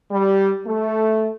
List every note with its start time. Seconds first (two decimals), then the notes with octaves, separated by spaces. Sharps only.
0.11 G3
0.67 A3